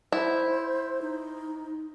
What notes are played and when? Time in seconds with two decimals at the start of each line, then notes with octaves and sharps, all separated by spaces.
0.12 E4 C5
1.02 D#4